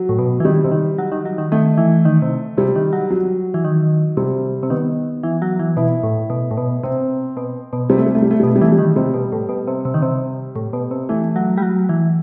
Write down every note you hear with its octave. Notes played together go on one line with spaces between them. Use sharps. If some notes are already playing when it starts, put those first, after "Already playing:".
Already playing: F#3
A2
B2
E3
D#3 G3
C3
D#3
F#3
D#3
F#3
D#3
D#3 A3
E3
D#3
C3
C3 G3
D#3
F#3
F#3
E3
D#3
C3 G3
C3
D#3 B3
E3
F#3
E3
B2 E4
A2
B2
A2
B2
C3 C4
B2
B2
C3 G3
A3
G3
A3
G3
A3
G3
B2 A3
G3
E3 A3
G3
D#3
C3 G3
B2
A2
B2
C3
C3
D#3
C3
A2
B2
C3
E3 A3
F#3
G3
F#3
E3